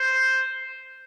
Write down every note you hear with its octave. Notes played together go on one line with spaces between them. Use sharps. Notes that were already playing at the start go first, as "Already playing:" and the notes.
Already playing: C5